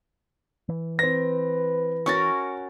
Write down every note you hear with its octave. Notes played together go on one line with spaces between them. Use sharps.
E3
C4 B4 A#6
C#4 F#4 A#4 C#6 A6